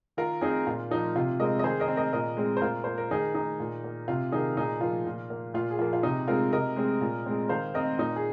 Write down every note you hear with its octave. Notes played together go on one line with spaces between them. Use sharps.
D#3 F4 A#4
C4 D#4 G#4
A#2 F4
F3 A#3 D#4
C3 F4
G#3 C4 A#4 D#5
D#5
D#3 G#4 C5
A#4 D#5
C4
A#4 D#5
A#2 A#4 D#5
G#3 C4
C5
A#2 F4 A#4
A#3 C5
A#4
D#3 D#4 G#4
A#3 D#4
A#2
A#3
C3 F4
D#3 A#3 D#4 G#4
A#2 D#4 G#4
F3 A#3 F4
A#2
A#3
A#2 F4
G#4
F3 A#3 F4
F4
C3 D#4 G#4
G#3 C4 F4 A#4
C3 A#4 D#5
G#3 C4
A#2
G#3 C4
D#3 C5 F5
C4 A#4 D#5
A#2 D#4
G#4